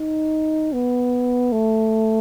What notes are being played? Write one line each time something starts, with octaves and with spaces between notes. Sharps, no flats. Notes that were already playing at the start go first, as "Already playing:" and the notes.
Already playing: D#4
B3
A3